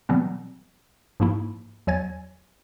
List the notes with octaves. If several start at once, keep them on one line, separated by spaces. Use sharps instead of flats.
B2 E3 F#3 G3 B3 C4
G#2 F3 A#3 E4
E2 F#3 C#5 G#5 G#6 A6